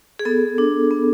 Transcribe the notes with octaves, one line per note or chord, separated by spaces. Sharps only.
G#4
B3 A4
D4
B3